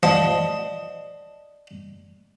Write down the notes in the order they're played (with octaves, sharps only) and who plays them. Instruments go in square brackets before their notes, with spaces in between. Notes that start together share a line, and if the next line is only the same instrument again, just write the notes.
[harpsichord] F3 [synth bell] D5 D#5 D#6 [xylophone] A5